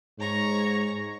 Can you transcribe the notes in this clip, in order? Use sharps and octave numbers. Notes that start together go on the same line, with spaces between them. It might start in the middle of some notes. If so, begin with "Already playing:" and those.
G#2 C#5 A#5 C#6